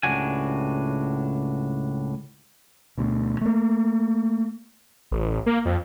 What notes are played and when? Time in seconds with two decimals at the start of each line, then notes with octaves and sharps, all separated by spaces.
0.03 C#2 A2 F#3 D4 F#4 G#5
2.98 D2 B2
3.41 A3 A#3
5.11 A1
5.46 A#3
5.65 F2